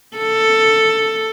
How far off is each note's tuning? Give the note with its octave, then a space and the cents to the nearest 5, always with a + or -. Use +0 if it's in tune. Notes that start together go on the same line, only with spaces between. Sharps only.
A4 +10